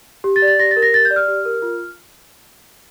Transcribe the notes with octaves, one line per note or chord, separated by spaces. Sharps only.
G4
A6
D5
A6
G4 A#6
A6
A#4
A#6
G4 A6
G6
D5
F6
G4
A#4
F4